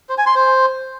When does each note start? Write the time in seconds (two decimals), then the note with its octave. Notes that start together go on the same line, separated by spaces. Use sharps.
0.09 C5
0.18 G#5
0.26 C6
0.35 C5